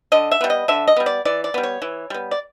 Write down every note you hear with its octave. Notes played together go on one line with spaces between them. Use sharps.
D3 D#5
E5
G3 B3
D#5
D3 E5
D#5
G3 B3
D5
E3 D5
D5
G3 B3
C#5
E3
G3 B3
D5